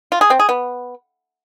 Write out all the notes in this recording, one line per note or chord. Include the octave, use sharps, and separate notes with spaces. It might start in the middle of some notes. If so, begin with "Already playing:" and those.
F4
G#4
C4
G#4
B3